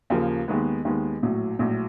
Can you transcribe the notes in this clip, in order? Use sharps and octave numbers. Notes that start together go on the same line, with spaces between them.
D#2 C#3 F3 A#3
D#2 D#3 G#3 B3
D#2 D#3 G#3 B3
A#1 A2 F#3
A#1 A2 F#3